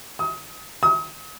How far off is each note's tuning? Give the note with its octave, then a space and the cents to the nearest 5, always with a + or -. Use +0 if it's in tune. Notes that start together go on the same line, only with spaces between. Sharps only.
D#6 +30
D#6 +40